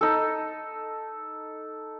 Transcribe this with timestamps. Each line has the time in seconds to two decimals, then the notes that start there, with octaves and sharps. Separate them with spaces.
0.01 D#4 A4